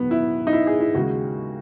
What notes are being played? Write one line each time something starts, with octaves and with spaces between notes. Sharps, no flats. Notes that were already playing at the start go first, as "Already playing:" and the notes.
Already playing: E1 D#3 F#3 B3
E4
D#4
E4
G#4
E4
D#2 C#3 G#3 F#4